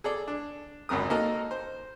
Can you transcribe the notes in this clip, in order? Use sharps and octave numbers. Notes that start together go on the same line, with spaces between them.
G#4 A4 D5
D4
G#1 C#2 F#2 A#4 D#6
A#3 D#4 F#4 A4 A#4 D#5
C5